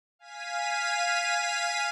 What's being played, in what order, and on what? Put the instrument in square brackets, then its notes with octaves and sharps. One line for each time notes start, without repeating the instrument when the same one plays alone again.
[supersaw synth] F5 G#5 B6 D#7